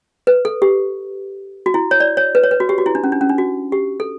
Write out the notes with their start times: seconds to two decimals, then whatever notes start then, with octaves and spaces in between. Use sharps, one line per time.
0.27 B4
0.45 A4
0.62 G4
1.66 F#4
1.74 E4
1.91 C#5
2.00 D5
2.17 C#5
2.35 B4
2.44 C#5
2.51 B4
2.60 F#4
2.69 G4
2.78 F#4
2.86 E4
2.95 D4
3.04 C#4
3.12 D4
3.21 C#4
3.29 D4
3.38 F#4
3.72 G4
4.00 A4